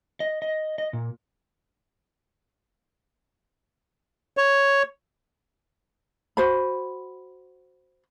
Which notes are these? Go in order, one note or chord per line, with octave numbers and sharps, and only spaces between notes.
D#5
D#5
D#5
A#2
C#5
F#4 C5 B5